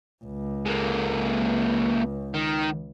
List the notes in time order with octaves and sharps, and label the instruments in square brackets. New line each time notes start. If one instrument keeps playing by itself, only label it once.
[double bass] C#2
[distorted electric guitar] G#3 A#3
D#3